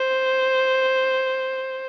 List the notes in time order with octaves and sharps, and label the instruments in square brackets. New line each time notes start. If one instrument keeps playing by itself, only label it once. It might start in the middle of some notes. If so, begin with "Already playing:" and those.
Already playing: [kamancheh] C5